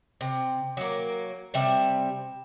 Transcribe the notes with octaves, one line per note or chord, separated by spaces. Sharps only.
C3
F#3 A#3
C3 G3 E5